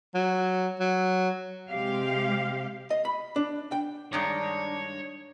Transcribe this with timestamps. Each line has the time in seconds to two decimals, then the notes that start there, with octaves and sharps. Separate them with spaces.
0.14 F#3
0.80 F#3
1.70 C3 G#3 G4 F5
2.90 D#5
3.05 B5
3.36 D4
3.72 G5
4.13 G2 D#3 G#3 D4 C#5